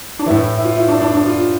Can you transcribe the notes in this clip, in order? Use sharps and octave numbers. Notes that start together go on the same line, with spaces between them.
D4
A2 E3 E4
E4
F4
E4
D4
D4
D4
F4